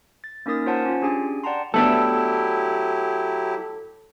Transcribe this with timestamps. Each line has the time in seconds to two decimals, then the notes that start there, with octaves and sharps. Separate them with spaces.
0.24 A6
0.46 A#3 C#4 D#4 A#4 D#6 A6
0.66 F4 C5 C#5 F#5 G#5 A5
0.85 C#4 F4
1.02 C#4 D4 G4 G#4 G#5
1.43 D5 F#5 G5 A5 A#5 C6
1.74 F#3 A3 B3 D4 E4 G4 A4